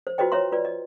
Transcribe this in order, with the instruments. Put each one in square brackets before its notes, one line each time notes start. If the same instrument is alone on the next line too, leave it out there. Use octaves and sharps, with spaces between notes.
[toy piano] C5
F4 F#4 B4 C5 D#5 G5
C5 C#5 E5 A#5 C6
F4 B4 D5
D#5